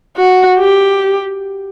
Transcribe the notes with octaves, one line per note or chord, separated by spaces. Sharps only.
F#4
G4